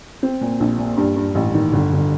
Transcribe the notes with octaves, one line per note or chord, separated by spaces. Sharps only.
C4
A#2
A#1
A#2
G2
G2
A1
D#3
G1
G1